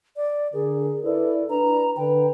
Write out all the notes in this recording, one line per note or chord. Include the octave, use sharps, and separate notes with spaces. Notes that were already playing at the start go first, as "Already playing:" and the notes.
D5
D3 G#4 A#4
E4 A4 B4 D5
D4 B4 A#5
D3 B4 G5